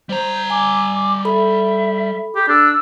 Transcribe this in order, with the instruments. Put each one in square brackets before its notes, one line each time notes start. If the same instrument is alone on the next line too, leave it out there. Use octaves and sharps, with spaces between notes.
[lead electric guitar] G3 A#5 [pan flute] C5
[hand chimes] G#5 [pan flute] D6
[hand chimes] A4 B5 [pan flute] E5
[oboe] G4 [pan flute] G#4
[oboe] D4 [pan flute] E6